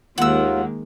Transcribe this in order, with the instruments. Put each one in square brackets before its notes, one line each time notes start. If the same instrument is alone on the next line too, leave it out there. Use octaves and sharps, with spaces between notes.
[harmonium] D#2 F4 [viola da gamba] D#3 G#3 A#3 [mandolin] F#5 E6